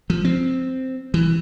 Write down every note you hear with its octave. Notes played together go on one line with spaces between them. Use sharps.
F3
C4
E3